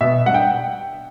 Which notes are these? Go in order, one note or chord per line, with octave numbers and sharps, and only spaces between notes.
B2 E5
G3 D4 F#5
G5